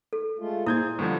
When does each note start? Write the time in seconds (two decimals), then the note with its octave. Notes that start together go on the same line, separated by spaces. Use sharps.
0.13 A4
0.39 G#3 A3 F4
0.67 A#2 E4 G#4 C5 D#6 G6 G#6
0.99 G2 D3 F3 B3 D#4